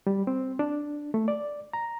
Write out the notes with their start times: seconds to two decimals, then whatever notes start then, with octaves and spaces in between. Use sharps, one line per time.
0.07 G3
0.27 C4
0.59 D4
1.14 A3
1.28 D5
1.73 A#5